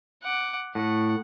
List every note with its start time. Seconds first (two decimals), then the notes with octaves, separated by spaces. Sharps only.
0.23 F#5 D6
0.75 A2 F#5